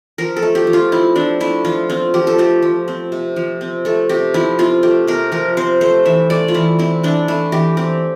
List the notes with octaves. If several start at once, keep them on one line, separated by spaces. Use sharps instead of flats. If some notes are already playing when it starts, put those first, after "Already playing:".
F3 A#4
A4
A3
G4
F3
F4
C4 E4
F3 D4
A3 E4
F3 F4
C4 F4
F3 G4
A4
A3 G4
F3
C4
C3
F3
C4
A3 A4
C3 G4
F3 E4
C4 F4
A3 G4
C3 A#4
F3 A#4
C4 C5
A3 C5
E3 E5
A3 D5
F4
E3 E4
C4 E4
E3 D4
A3 E4
E3 G4
C4 G4